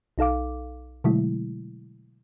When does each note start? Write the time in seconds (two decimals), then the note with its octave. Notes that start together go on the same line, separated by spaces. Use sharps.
0.18 B1 D#4 A4 F5 D6
1.04 B2 D3 F#3 G#3 A3 E4